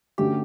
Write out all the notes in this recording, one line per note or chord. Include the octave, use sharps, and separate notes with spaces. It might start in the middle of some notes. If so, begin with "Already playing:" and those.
D3 A3 C#4 F#4 G4